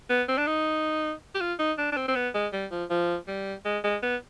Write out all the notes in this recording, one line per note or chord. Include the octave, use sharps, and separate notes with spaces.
B3
C4
D4
D#4
G4
F4
D#4
D4
D4
C4
C4
B3
G#3
G3
F3
F3
G3
G#3
G#3
B3